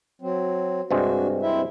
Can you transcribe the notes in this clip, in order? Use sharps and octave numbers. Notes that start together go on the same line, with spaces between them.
F#3 C4
G2 C3 G#3 D4 F#4
C4 E4 E5